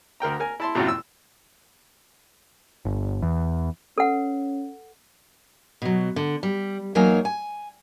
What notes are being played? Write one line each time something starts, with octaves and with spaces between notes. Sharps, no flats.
D2 A#4 G5 A#5
A#4 G#5
E4 A5 C6
F#2 A2 C3 F#3 E4 F4
E6
G1
E2
C#4 A4 B4 F#5
B2 F#3
D3
G3
E2 F#3 A#3 D#4 C#5 G#5
G#5